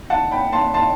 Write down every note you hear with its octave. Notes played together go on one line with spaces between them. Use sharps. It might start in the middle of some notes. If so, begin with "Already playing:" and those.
F#5 A5
G5 B5
A5 C6
A5 C6